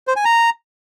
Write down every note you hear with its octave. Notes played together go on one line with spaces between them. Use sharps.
C5
G#5
A#5